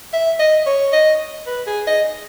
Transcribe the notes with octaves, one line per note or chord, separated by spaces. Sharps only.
E5
D#5
C#5
D#5
B4
G#4
D#5